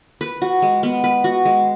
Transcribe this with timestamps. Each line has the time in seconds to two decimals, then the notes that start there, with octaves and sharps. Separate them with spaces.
0.21 B4
0.42 F#4
0.62 G#3
0.83 B3
1.04 B4
1.24 F#4
1.45 G#3